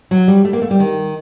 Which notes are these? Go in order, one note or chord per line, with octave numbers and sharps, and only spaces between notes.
F#3
G3
A3
A#3
A3
G3
D#3